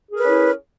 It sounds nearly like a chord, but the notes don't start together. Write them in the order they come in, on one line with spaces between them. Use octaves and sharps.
G#4 A#4 B4 C#4 E4